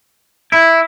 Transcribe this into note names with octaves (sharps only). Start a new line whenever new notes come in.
E4